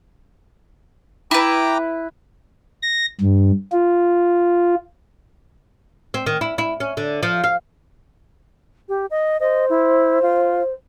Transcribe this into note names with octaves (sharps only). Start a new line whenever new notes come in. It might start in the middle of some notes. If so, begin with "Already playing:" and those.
E4 B4 G5 A#5 D6
A#6
G2
F4
C4
D#3
E4
E4
C#4
D3
F3
F5
G4
D#5
C5 D#5
E4
F4